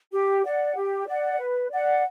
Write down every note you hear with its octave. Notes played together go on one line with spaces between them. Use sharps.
G4
D5 F#5
G4
D5 F#5
B4
D5 F#5